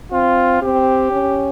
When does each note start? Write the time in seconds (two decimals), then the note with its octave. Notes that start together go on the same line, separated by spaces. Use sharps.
0.12 C4 F4
0.62 C4 G4
1.11 C#4